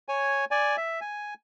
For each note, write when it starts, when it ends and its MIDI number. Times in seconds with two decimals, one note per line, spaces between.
0.09 0.45 73
0.09 0.45 80
0.51 0.76 74
0.51 0.76 80
0.77 1.00 76
1.01 1.34 80